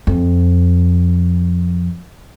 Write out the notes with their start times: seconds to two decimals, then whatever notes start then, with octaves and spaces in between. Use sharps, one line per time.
0.07 F2